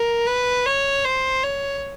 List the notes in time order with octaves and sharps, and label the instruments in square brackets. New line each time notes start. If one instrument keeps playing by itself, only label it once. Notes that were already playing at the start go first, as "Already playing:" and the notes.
Already playing: [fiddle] A#4
B4
C#5
C5
C#5